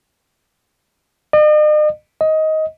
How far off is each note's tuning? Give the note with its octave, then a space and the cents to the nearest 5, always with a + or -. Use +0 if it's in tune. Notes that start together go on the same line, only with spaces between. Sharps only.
D#5 -45
D#5 +15